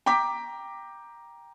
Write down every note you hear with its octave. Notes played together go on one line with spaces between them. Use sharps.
G5 A#5 D6 B6